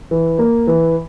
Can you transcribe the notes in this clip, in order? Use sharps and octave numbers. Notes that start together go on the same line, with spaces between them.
E3
A#3
E3